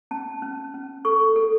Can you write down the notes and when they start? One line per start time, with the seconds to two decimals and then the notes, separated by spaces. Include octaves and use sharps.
0.11 C#4 A5
0.42 C#4
0.74 C#4
1.05 A4 C#6
1.36 A4